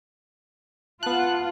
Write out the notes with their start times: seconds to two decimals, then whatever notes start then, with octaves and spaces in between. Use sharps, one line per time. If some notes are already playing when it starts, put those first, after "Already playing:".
1.03 B3 F4 F#5 A5 F#6